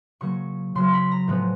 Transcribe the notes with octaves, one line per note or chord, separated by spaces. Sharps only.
C#3 F#3 A#3 C#6
C#3 F#3 A#3 C6
B5
A#5
A2 F3 G#3 B3